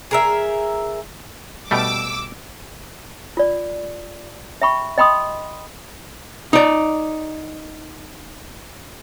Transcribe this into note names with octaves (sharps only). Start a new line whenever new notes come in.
G#4 A#4 E5
B2 G3 A3 D6 E6
F4 D5
E5 G5 B5 C#6
D#5 G5 B5 C6 D#6
D#4 D5